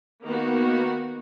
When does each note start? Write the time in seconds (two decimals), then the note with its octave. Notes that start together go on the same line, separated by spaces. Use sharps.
0.24 D#3 A#3 B3 F#4